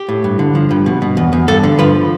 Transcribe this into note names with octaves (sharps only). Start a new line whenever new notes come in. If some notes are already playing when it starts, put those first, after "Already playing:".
Already playing: G4
A2
G2
D3
F3
G2
B2
B2
E2
E2
G2 A4
D3
F3 B4